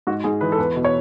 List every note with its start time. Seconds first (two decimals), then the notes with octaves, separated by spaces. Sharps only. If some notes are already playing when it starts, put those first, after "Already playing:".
0.07 G#2 F#4
0.24 G#2 G#4
0.41 E3 B4
0.52 A4
0.58 E2 B4
0.76 B2
0.84 C#5